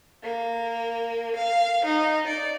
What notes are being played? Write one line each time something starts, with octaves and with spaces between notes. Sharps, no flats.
A#3
F5
D#4
D5